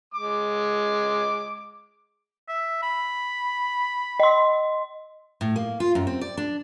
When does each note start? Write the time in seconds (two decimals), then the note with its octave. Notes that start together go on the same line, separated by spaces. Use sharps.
0.14 G#3 D6
2.49 E5
2.83 B5
4.20 D#5 C6
5.41 A2
5.56 A#3
5.80 F4
5.95 F#2
6.07 C4
6.21 D5
6.37 D4